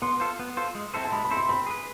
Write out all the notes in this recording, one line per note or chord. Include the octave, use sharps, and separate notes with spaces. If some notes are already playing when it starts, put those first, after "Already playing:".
B3 C6
F4 A4 C5
B3
F4 A4 C5
G#3
C4 E4 A4 C5
A5
G#3 B5
B5
C4 E4 A4 C5
C6
C4 B5
G#4 B4